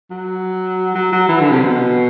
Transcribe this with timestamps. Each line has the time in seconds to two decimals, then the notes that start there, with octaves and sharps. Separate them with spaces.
0.10 F#3
0.95 F#3
1.12 F#3
1.29 E3
1.40 D3
1.51 C3
1.63 B2